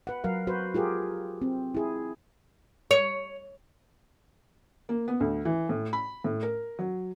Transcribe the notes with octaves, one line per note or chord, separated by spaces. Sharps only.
B4 F#5
F#3 A#4 F5
F#4 B4 C5
F4 G4 G#4 A#4
C4
E4 G#4
C#5
A#3
B3
D2
E3
A2
B5
A2
A#4
F#3